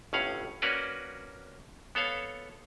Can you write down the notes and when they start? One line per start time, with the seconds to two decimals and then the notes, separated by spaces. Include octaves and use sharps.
0.13 G1 A2 C#4 F5 F#5
0.62 A#3 C#4 F#4 A#4 B4 D5
1.95 B3 A4 C#5 F5